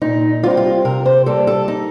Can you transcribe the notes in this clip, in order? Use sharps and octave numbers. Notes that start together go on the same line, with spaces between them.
A#2 D#4
G3 C4 D#4 F4
F4
C3 A#4
C5
G3 A#3 A4
A4
D#4